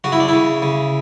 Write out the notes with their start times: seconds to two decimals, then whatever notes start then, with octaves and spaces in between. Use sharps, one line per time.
0.04 C#3 F#4
0.12 E4
0.20 D4
0.28 E4
0.33 C#3
0.62 C#3